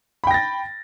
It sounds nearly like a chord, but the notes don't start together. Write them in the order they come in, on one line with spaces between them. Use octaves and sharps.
B5 G5 A#6 A6